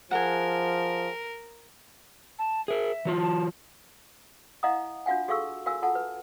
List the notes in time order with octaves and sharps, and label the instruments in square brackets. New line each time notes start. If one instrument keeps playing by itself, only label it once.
[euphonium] F3 [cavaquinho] G#4 F#5 [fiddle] A#4
[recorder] A5
[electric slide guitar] G#4 A#4 [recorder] E5
[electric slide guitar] E3 F#3 F4
[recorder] A5
[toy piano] E4 D#5 F5 F#5 A#5 D#6
D4 F4 F#4 F5 F#5 G#5
F#4 G#4 A4 F5 C#6 E6
F#4 A#4 F5 G#5 E6
F4 A4 F#5 A5
B4